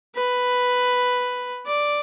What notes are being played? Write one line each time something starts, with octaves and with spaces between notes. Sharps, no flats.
B4
D5